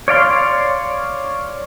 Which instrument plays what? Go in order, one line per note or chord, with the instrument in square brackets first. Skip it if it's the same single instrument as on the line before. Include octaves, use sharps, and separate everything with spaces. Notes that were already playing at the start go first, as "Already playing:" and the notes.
[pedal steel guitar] C#5 D5 F5 C6